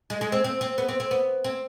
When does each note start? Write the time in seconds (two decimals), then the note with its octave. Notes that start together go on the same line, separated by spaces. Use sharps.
0.10 G#3
0.21 G#3
0.32 C4
0.44 C4
0.61 C4
0.78 B3
0.89 C4
1.00 C4
1.11 B3
1.44 C4